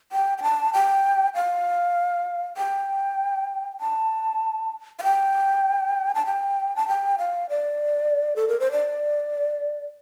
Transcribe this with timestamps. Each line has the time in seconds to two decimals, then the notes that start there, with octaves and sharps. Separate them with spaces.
0.12 G5
0.38 G5
0.43 A5
0.73 G5
1.35 F5
2.57 G5
3.80 A5
4.99 F5
5.03 G5
6.15 A5
6.26 G5
6.76 A5
6.88 G5
7.19 F5
7.49 D5
8.36 A4
8.48 A#4
8.60 C5
8.72 D5